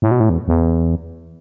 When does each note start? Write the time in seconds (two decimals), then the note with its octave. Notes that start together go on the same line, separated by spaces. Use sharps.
0.02 A2
0.11 B2
0.20 A2
0.29 E2
0.48 E2